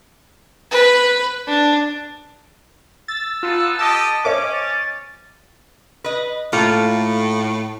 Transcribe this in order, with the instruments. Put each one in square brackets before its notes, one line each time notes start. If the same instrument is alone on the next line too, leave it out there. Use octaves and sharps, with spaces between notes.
[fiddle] B4
D4
[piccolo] E6 [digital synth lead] A6
[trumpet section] B3 D#4 A5 [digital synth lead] F4
[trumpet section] G4 A4 D#5 [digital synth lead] A5
[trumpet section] C#4 [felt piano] C5 C#5 D#5 [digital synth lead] D6
[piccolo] A6
[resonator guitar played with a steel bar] B4 D#5
[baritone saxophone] A2 [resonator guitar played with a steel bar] A#3 F4 A4